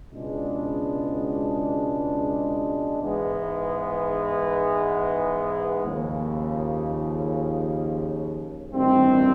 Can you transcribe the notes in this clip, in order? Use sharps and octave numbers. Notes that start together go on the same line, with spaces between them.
C#2 B2 G#3 B3 D4
G#2 E3 G#3 B3
D#2 C#3 F3
A1 G2 D#3 G3 C4